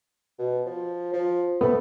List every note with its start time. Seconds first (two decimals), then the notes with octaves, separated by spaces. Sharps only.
0.39 B2
0.66 F3
1.13 F3
1.61 A3 B3